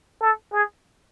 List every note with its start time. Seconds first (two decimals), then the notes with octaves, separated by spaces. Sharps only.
0.21 A4
0.53 G#4